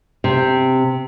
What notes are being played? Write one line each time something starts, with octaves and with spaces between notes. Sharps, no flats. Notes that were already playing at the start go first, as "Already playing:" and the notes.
C3